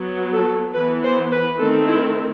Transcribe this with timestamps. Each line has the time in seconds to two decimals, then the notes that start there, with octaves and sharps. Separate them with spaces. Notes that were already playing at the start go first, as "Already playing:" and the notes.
Already playing: F#3 B3
0.32 A4
0.74 E3 B3 B4
1.03 C5
1.31 B4
1.58 D#3 A3 C4 A4
1.87 E4